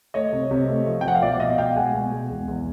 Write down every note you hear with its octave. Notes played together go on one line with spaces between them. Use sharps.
A3 C#5 D#5
C3
C3
A3
F3
G5
F3 F#5
F5
B2 D5 E5
B2 D#5 F5
B2 F5 G5
G#3 F#5 G#5
B2
G#3
E2
E2